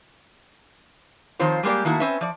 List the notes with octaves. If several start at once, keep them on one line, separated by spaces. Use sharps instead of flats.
D#3 F3 C4 F4 C5 C#5
G3 G#3 A#3 G4 D5
D#3 A3 A#3 E4 F#4
C4 C#4 B4 E5
F3 D5